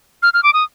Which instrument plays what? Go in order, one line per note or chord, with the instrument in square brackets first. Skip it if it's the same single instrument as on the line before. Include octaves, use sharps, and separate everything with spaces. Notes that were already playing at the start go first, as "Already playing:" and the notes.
[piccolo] F6
F6
D6
D#6